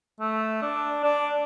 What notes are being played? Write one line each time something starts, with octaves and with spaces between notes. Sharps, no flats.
A3
D4
D4